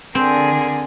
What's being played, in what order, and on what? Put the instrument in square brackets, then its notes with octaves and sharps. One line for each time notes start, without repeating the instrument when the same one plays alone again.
[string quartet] D3 G#4 A#4 [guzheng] C4